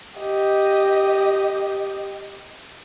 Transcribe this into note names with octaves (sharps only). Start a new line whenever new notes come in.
G4 D#5